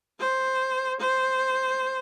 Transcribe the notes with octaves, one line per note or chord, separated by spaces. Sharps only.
C5
C5